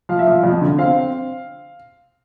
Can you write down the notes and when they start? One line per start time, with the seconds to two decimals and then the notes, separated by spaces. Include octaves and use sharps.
0.09 F3 F5
0.19 E5
0.27 F3 F5
0.43 F2
0.61 D3
0.78 C4 F5